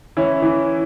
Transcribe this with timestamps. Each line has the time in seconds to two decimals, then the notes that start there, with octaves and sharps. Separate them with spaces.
0.17 E3 C#4 E4
0.42 E3